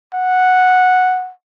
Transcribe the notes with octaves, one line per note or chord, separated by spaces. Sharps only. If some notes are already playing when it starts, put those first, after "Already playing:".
F#5